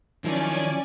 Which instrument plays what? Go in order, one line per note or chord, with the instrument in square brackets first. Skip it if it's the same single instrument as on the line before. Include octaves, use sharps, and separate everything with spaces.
[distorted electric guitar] D#3 [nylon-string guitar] F3 F#3 E4 [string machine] C#4 D5 G#5